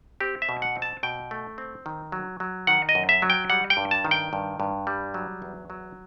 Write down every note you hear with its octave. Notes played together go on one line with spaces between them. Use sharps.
C4 G4
E5
B2
F#5
C4
A5
B2 G5
A3
C4
D#3
F#3
F#3
D#3 F#5
D#5
F#2
E5
F#3
G5
G3 F#5
G5
G2
A5
D#3
G5
G2
G2
G3
F#3
E2
F#3